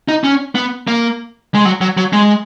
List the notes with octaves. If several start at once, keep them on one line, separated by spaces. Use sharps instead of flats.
D#4
C#4
B3
A#3
G#3
F#3
F#3
F#3
G#3